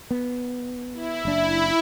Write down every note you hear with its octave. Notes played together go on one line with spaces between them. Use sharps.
B3
E4
F#1 D4